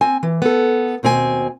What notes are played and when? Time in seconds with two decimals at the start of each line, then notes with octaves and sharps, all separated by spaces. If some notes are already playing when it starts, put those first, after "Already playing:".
0.01 C4 G#5
0.23 E3
0.42 B3 A4
1.03 D#2 B2 C4 G#4 G#5